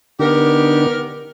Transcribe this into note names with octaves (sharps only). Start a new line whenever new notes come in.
D3 B3 D4 D#4 G4 A#4